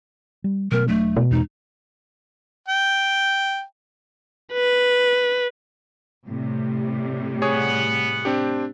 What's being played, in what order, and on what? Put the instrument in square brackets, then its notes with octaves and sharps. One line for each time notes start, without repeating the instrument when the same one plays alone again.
[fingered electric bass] G3
[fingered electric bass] B2 F#3 A3 [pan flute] A#4
[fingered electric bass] E1 F#3 D4 [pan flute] A3
[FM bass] B2
[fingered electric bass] E2 G#3 [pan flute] D#4
[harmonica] G5
[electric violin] B4
[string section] A2 C3 G3
[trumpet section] B3 F#5 [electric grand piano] G#4 C#5 D#6
[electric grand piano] C4 D4 G4